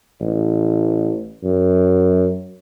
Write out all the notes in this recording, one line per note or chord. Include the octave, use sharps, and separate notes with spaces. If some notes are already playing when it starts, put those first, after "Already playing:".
A1
F#2